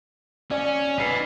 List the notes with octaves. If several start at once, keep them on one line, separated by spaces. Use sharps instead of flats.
C#4 D5 G#5
D#4 B4 B6 C7